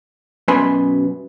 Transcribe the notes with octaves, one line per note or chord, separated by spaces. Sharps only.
F#2 B2 B4 G#5 C6